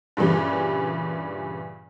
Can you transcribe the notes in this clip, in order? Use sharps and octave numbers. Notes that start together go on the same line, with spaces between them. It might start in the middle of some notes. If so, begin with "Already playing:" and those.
G2 A#2 C#3 E3 G3